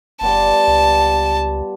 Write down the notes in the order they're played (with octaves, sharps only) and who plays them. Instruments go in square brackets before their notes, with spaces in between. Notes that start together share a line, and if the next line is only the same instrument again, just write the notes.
[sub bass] F#1 [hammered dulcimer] G3 B3 F4 [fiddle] A5
[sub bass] C#2